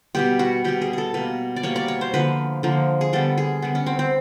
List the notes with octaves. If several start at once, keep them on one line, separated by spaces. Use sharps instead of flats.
B2 G3 B3 G4
F#4
B2 G3 B3 G4
G#4
G#4 A4
B2 G3 A#3 B4
D5
B2 G3 A#3 C#5
D5
C#5
C5
D3 F3 A#3 B4
D3 F3 A#3
G#4
D3 G3 B3 A4
G#4
D3 G3 B3
C#4
C4
C4